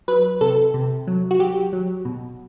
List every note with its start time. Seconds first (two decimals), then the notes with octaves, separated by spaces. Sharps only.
0.08 F#3 B4
0.41 C3 A4
0.74 C3
1.07 F#3
1.31 F#4
1.39 F#3 G4
1.73 F#3
2.05 B2